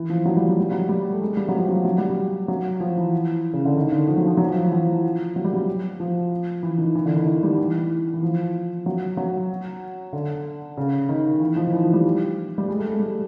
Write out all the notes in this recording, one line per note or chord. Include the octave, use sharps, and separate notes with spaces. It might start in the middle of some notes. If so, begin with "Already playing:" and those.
Already playing: E3
F3
F#3
G3
F#3
G3
F#3
G3
A3
G#3
G3
F#3
F3
F#3
F#3
G3
F#3
F#3
F3
E3
C#3
D3
D#3
D3
F3
F#3
F3
F#3
F3
E3
F3
F#3
G3
F#3
F3
E3
D#3
E3
D3
D#3
D#3
G3
E3
E3
F3
F#3
F#3
D3
C#3
D#3
E3
F3
D#3
E3
F3
G3
G3
G#3
A3
G#3
G3